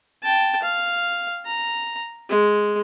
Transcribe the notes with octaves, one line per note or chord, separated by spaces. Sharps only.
G5 A5
F5
A#5
G#3